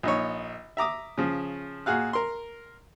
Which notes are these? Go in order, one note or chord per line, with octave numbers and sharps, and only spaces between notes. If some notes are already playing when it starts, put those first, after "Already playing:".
A#1 D#4 C#5
E5 A#5 D6 D#6
C#3 F3
A#2 F#4 G#4 F5 F#6
A#4 C6